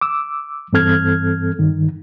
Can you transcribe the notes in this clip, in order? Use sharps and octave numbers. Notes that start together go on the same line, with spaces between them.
D6 E6
G2 E3 C4 A4 F6 G#6
G2 D#3